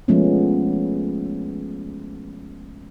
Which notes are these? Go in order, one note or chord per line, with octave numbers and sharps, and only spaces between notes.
F3 G#3 A3 B3 C#4